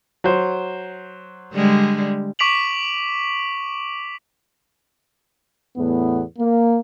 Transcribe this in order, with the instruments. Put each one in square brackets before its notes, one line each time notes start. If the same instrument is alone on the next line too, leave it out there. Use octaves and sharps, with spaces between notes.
[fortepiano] F#3 C5
[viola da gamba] D3 G3 G#3
[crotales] C#6 D6 B6 D7 F7 F#7
[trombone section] E2 A2 B3
A#3